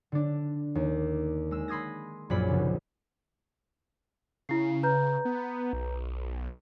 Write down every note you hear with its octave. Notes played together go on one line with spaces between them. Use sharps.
D3 D4
D#2
G#3 E6
B5 C6 D#6 G#6 A#6
A#1 F#2 F4 G#4 D5 B5
F1 C#2
C#3 E4 C7
B4 A#5 G6
B3
B1